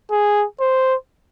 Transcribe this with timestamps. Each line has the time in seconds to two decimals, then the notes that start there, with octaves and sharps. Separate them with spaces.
0.11 G#4
0.60 C5